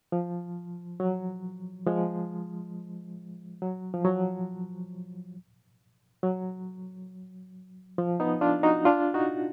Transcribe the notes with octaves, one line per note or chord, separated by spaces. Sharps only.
F3
F#3
F3 G#3
F#3
F3
F#3
F#3
F3
B3 D#4
D4 F4
D#4 F#4
D4 F4
D#4 F#4